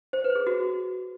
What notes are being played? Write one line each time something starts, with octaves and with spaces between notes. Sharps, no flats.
C5
B4
G#4
F#4